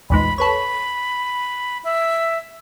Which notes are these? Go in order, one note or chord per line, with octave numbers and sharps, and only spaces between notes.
A#1 E2 G#2 B5
A4 B4 C#5 B5
E5